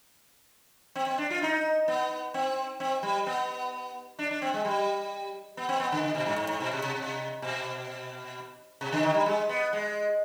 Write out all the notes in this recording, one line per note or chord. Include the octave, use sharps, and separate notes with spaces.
C4
C4
D4
F4
D#4
B3
C4
C4
G3
B3
D4
D4
C4
G#3
G3
B3
C4
B3
D3
D3
B2
G#2
G#2
G#2
B2
C3
C3
C3
B2
C3
D3
D#3
G3
G#3
B3
G#3